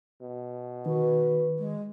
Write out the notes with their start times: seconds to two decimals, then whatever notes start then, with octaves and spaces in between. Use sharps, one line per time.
0.21 B2
0.86 D#3 F#4 B4
1.59 G#3